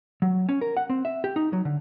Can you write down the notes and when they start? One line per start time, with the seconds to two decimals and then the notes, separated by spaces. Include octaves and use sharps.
0.22 F#3
0.49 C#4
0.61 A#4
0.77 F#5
0.90 C4
1.05 E5
1.24 G4
1.36 D#4
1.53 F#3
1.65 D3